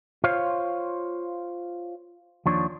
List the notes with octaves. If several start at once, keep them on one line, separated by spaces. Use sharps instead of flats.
F4 C5 C#5 F5
D#2 F3 D4 C#5